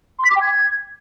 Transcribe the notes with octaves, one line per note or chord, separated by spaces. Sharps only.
C6
B6
D6
G5
G#6